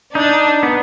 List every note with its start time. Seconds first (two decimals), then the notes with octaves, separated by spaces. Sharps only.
0.15 D4 D#4
0.63 B3